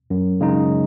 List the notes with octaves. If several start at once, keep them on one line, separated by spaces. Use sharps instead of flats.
F#2
C#3 G#3 D#4